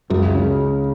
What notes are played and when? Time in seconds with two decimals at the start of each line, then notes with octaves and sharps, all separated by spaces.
0.10 C#2 F#2
0.35 C#3